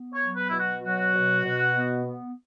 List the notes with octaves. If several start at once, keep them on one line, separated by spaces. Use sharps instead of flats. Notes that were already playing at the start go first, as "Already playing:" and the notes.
Already playing: B3
C#5
F#3
B4
B2 E4
F#4
F#3 F#4
B2
B2
B3
B3